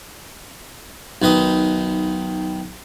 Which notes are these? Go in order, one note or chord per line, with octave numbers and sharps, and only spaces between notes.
B1 D#3 B4 D#5